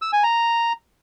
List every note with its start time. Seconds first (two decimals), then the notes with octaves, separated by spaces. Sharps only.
0.02 E6
0.13 G#5
0.23 A#5